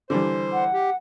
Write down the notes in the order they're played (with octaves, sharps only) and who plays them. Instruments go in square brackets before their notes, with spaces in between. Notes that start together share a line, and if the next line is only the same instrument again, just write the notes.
[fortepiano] D3 E3 G3 [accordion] C5
[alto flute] F#5
[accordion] G4